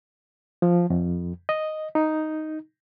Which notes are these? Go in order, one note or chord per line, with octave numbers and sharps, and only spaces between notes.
F3
F2
D#5
D#4